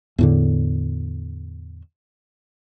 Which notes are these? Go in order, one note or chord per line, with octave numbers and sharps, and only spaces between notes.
E2 A2 D3